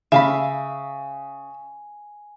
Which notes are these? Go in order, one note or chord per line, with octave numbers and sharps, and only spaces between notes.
C#3 E5 F5 G#5 B5